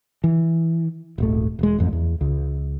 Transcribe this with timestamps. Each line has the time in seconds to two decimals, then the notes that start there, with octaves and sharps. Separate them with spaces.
0.24 E3
1.18 D#1 G#1 A3
1.59 E1 G#3
1.78 A1 F2
1.93 E2
2.21 C#2